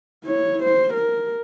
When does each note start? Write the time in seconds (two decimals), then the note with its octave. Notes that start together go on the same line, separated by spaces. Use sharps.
0.24 E4 C#5
0.63 C5
0.94 A#4